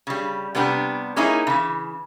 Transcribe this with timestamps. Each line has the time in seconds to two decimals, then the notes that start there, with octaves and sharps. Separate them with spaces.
0.07 C#3 G3
0.55 C3 G3 B3 D4 G4
1.16 A#3 C#4 D#4 E4 G#4
1.47 C#3 E3